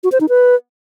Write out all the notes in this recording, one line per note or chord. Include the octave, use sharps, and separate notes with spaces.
F#4
C5
D#4
B4